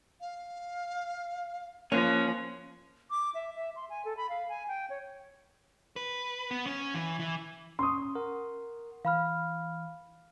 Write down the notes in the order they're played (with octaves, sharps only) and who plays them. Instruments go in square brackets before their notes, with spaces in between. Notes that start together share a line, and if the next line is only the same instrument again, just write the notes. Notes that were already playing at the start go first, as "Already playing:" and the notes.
[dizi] F5
[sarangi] F3 [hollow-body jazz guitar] A#3 [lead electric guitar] C#4 [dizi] F#6
[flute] D6
E5
E5
C6
G#5
A4
B5
F5
G#5
G5
C#5
[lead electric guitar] B4
B3
C#4
E3
E3
[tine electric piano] C#4 [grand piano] C6 C#6 D#6
[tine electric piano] A#4 F#5
[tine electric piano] E3 [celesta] F5 B5 F6